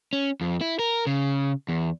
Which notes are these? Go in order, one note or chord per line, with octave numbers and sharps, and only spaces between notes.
C#4
F2
E4
A#4
C#3
E2